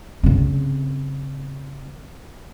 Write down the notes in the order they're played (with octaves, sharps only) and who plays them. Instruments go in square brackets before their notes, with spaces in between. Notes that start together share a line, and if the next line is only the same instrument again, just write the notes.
[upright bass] C#3 C4